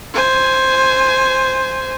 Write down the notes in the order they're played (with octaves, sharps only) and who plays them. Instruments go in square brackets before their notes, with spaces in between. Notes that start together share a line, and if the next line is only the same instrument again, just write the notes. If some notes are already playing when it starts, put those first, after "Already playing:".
[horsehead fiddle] C5 G#5